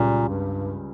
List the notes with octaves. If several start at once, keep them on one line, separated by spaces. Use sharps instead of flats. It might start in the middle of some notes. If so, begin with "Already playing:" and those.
Already playing: C#2 A#2 C#3 G3 C#4
G2